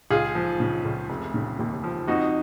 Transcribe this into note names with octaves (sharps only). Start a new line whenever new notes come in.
C#2 F4 G#4
F3
C#3
C#2
F1
C#3
D#2
F3
F2 D#4 F#4